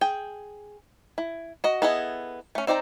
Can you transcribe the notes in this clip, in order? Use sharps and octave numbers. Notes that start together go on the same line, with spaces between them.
G#4 G5
E4
F#4 D#5
B3 E4 G#4 A4 D#5
A3 C#4
C4 D#4 D5 G5 A#5